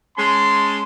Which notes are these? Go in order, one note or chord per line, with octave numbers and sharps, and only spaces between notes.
G#3 C#4 A5 C6